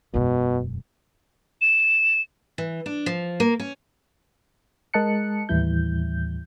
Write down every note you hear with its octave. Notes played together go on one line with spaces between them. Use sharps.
E1 F#2 B2
E7
E3
D4
F3
A#3
C#4
G#3 A#4 D#5 A5 F#6 C#7
D#2 A2 E3 G3 E4 G6